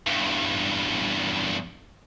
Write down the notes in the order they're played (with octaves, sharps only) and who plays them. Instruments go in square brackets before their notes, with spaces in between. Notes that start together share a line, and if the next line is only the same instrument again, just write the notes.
[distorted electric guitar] E2 G2